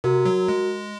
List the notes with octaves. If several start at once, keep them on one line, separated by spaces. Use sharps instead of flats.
C3 F#4 A#4
F#3
G#3